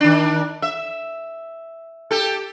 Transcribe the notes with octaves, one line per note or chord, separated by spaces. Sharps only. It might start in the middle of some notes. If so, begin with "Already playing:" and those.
D#3 D4
E5
G4 A4